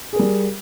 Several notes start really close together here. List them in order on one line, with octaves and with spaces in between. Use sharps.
G#4 A#4 G3